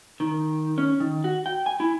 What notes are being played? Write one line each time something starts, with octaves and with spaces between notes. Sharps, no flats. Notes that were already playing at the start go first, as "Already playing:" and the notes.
D#3
C#4
D#3
F#4
G5
G#5
E4